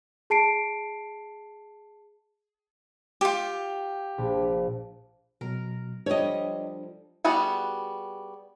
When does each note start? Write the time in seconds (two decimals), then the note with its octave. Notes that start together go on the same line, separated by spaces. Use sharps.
0.30 G#4 A5 C7 D7
3.21 F4 G4
4.18 A#1
5.41 B2 F#3 A#4
6.06 F3 G3 D4 A4 C#5 D#5
7.24 G3 B3 F#4 G#4 F#5